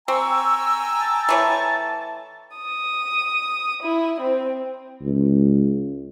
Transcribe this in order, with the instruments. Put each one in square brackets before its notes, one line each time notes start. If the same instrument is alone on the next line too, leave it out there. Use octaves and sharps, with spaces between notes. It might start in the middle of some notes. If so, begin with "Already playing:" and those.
[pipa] C4 [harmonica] G5 G#5 A#5 [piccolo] C#6 [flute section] E6
[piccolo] A5
[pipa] E3 A3 C#5
[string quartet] D#6
E4
C4
[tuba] C#2